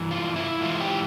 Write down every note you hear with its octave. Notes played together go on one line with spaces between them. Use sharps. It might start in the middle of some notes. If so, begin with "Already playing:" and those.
Already playing: G2 E3
F4
E4
G#2 E3 F4
G4